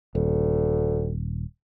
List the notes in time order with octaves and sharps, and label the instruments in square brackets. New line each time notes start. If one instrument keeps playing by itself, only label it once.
[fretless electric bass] D#1 [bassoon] D2